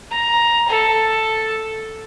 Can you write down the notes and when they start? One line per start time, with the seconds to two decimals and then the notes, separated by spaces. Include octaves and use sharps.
0.10 A#5
0.69 A4